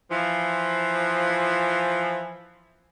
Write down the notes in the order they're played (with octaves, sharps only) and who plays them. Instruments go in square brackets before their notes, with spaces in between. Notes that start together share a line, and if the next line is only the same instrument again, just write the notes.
[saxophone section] E3 F3